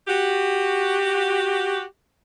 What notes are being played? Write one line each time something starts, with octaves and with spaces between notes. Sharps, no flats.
F#4 G4